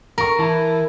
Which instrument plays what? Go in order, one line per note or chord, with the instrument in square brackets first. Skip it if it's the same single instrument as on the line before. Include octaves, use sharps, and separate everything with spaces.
[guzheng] A#4 [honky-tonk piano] A#5 C#6
[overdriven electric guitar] E3 [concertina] E4 [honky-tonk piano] A5